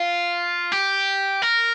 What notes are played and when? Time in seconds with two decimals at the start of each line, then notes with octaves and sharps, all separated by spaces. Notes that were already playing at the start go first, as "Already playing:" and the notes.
Already playing: F4
0.72 G4
1.42 A#4